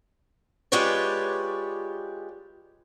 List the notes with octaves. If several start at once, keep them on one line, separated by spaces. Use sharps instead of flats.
G#3 F4 G4 B4 C#5 D5